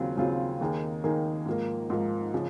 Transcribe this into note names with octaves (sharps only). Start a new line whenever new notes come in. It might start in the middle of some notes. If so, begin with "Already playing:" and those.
Already playing: D#2 C#3 F#3 C4 F4
D#2 C#3 F#3 C4 F4
D#2 D#3 A#3 D#4 G#4
D#2 D#3 A#3 D#4 G#4
G#2 F3 A#3
G#2 F3 A#3
C#3 F3